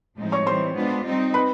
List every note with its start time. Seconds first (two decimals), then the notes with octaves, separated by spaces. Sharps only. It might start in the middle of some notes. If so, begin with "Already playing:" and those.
0.18 A2 F3 G#3 C4 D#4
0.32 C#5 C#6
0.46 E3 G3 C4 C5 C6
0.76 G#3 B3 D4 F4
1.05 G3 C4 D#4
1.34 B4 B5